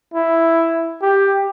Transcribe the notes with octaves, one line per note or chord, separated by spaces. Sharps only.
E4
G4